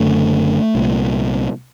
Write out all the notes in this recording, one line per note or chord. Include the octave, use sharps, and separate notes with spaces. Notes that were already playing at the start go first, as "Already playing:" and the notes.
Already playing: F#1 F#2 D3 A3
C2 A#2